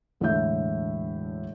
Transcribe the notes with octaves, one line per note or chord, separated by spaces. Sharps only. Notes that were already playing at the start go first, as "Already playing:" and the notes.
E1 A2 D3 A4 E5 G6